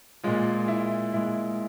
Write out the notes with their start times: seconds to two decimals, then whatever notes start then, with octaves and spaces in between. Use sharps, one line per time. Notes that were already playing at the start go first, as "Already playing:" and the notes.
0.24 A#2 G#3 F4
0.68 E4
1.13 A#2 G#3 E4